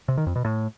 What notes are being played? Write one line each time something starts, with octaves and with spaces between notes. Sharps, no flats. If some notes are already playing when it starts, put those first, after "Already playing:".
C3
D#3
F2
B2
A2